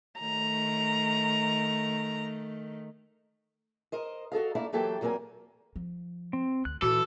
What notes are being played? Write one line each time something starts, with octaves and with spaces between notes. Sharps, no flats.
D#3 A3 A#5
A#4 C5 D#5
F#4 A4 D#5 F5
A3 A#3 D4 E4 F5
E3 F#3 A#3 G4 A4 G5
E2 F#3 A#3 C4 A#4 G#5
F3
C4
D2 F#6
A#2 E3 F#4 A4